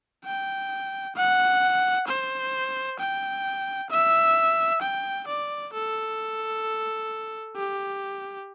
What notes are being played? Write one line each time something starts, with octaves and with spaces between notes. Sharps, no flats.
G5
F#5
C5
G5
E5
G5
D5
A4
G4